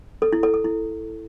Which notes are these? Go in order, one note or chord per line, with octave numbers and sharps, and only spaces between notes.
A4
E4
A4
A4
E4